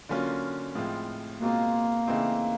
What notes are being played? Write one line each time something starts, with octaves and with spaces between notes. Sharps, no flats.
D3 F#3 A#3 C#4 F4
A2 F3 G#3 C4 F4
B2 G#3 A#3 C4 F4
C#3 E3 A3 C4 D#4